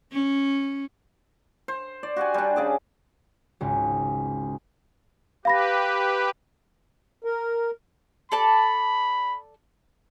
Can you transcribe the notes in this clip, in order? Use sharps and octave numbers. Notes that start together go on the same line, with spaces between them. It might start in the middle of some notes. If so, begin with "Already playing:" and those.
C#4
C5
D5
F#4 G4 F#5 G#5
G3 D4
C#3 G#4 D5
G#1 C#2
G4 B4 F5 B5 A#6
A#4
A4 D5 A5 B5